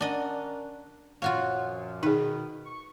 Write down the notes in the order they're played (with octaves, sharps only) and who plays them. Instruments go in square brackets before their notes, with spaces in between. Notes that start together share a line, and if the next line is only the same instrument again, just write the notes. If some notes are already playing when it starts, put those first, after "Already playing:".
[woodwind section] C#4 A#4 D5 [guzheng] D4 D#5 [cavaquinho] F#5
[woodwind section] F#2 A#2 F3 [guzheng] F4 F#4 C#5 [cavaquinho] F5 F#5
[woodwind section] B2 D#3 [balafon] D#4 G#4 [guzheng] B4
[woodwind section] C#6